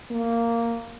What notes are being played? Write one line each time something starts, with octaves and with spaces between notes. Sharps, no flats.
A#3